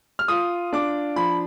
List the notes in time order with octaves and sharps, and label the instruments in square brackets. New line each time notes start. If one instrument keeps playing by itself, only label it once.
[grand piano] F6
F4 D#6
D4 D6
F3 B5